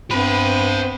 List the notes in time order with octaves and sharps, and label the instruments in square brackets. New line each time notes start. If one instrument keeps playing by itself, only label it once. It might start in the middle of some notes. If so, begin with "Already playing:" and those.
[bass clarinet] G2 [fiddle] B3 C4 [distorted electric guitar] C5 B5